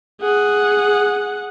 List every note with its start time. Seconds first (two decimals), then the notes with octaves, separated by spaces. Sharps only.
0.21 G#4 F#5